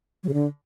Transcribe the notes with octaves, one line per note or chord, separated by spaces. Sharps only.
F#3
C#3
D3